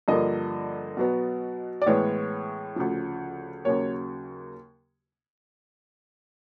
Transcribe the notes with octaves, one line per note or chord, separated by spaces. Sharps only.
G2 D3 F3 A#3 D#5
B2 F#3 B3
D5
A2 E3 G#3 B3 C#5
D2 C#3 F3
D#2 C#3 F#3 A#3 C#5